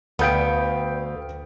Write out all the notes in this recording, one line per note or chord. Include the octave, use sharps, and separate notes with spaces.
D2 B3 A4 F5 G5 D#6 G6 D7